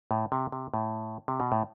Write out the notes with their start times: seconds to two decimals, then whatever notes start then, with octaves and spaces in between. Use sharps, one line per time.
0.11 A2
0.32 C3
0.52 C3
0.74 A2
1.28 C3
1.40 B2
1.52 A2